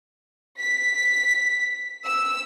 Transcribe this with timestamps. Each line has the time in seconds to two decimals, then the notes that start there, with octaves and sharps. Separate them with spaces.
0.59 B6
2.06 E6